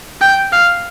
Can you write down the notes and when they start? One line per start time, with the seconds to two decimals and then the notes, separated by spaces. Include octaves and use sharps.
0.21 G5
0.52 F5